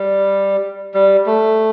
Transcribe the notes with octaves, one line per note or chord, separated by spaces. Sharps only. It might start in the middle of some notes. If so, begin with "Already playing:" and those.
Already playing: G3
G3
A3